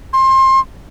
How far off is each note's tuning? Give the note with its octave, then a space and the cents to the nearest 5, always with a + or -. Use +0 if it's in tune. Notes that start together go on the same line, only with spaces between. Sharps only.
C6 +25